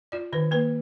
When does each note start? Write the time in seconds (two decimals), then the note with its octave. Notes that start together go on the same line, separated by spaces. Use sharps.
0.12 F4 D5
0.33 D#3 B4
0.51 A#3 B4